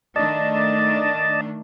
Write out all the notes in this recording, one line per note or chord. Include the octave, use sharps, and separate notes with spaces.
D#3 A3 D4 D5 D#5 A5